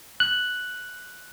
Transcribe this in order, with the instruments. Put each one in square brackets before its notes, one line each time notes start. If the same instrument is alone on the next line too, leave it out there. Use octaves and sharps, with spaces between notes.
[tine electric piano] F#6